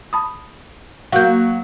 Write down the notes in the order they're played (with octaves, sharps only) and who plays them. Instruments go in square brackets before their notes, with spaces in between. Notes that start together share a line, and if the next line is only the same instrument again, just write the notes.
[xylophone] A5 B5 D#6
[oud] F#3 A#3 [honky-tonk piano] F#4 [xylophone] F5 G6